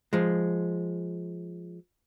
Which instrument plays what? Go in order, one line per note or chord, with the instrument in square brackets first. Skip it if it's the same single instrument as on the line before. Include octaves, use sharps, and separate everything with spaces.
[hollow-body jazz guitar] F3 G#3